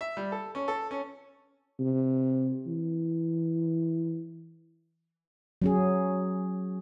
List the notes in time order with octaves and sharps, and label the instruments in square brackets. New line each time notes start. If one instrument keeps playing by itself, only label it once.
[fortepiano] E5
G3
A4
C#4
A4
C#4
[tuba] C3
E3
[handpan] F#3 C#4 G#4